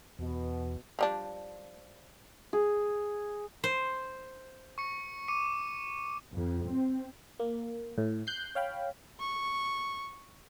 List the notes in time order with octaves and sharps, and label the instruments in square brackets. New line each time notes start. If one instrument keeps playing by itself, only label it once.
[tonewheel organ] E2 [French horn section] B2
[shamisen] F3 G3 D4
[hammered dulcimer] G#4
[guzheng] C5
[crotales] C#6 C#7
D6 C#7 D#7
[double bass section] F2
C4
[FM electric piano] A#3
A2
F#6 G6 C7
C#5 F5 G5 B5
[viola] C#6